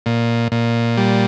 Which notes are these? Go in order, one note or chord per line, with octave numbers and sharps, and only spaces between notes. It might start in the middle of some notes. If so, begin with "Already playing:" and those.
A#2
A#2
G3